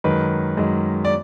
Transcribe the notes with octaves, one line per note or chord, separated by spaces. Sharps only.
F#2 D#3 G#3 B4
F#2 D#3 G#3
D5